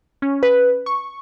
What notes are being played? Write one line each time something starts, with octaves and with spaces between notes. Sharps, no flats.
C#4
B4
C#6